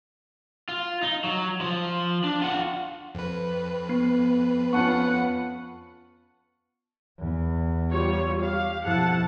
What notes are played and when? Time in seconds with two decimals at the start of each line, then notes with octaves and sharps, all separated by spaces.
0.69 F4
1.03 D#4
1.24 F#3
1.61 F3
2.24 D4
2.42 F4 F#5
3.15 F2 B4
3.89 B3 C7
4.73 B3 C#4 F4 F#5 A5 C#6
7.19 E2
7.91 G3 F4 C#5
8.42 G4 F5
8.83 F2 B2 E4 F#5 A5